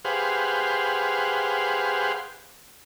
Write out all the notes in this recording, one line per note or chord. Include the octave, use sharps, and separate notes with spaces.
G4 G#4 B4 C5 F5 F#5